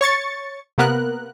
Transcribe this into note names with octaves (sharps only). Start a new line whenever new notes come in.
C#5 C#6 A6 C#7
C3 A#3 B3 A#4 F#6